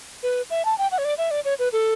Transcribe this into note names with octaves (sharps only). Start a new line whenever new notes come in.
B4
E5
A5
G5
F#5
C#5
D5
E5
D5
C#5
B4
A4